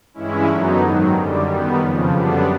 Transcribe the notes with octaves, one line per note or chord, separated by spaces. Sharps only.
G2 E3 G#3 C#4 E4
F#2 D3 F#3 B3 D#4
G#2 D#3 F#3
F#2 D3 G3
D#3 G3 B3
F2 C#3 F3
F#2 D3 G3 B3 D4